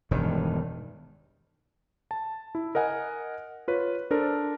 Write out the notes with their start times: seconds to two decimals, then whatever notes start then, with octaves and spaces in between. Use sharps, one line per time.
0.11 E1 G2 D#3
2.11 A5
2.55 E4
2.75 A#4 D#5 F#5 G#5
3.68 F4 B4 C#5
4.11 D4 A4 A#4 C5